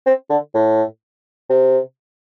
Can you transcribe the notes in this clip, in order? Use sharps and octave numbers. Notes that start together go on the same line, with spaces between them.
C4
D3
A2
C3